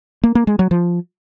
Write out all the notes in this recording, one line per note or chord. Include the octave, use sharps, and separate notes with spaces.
A#3
A#3
G#3
F#3
F3